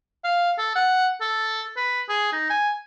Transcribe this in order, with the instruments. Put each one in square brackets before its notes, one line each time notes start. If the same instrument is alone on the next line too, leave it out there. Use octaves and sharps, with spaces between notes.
[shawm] F5
A4
F#5
A4
B4
G#4
D#4
G#5